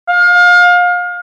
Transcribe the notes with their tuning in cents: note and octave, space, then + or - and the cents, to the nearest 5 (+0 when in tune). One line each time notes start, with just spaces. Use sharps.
F5 +30